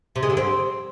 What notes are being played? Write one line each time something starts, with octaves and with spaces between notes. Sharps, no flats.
C3
G#3
D3
C4